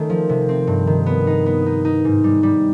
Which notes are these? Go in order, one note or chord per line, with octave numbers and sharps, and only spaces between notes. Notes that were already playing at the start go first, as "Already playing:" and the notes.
Already playing: D#3 A3 C#4
F3
C3
C4
G2
D#3
B3
D#4
B3
D#4
D#4
G#2
G3
G3